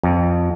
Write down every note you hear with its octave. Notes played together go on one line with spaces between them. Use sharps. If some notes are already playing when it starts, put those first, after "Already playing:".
F2